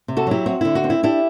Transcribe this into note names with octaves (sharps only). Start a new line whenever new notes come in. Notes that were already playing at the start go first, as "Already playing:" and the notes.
C3
F#4 A4
F#3 E4 G4
C4 F#4
D3 E4
F#4
C4
E4
D4 E4 G4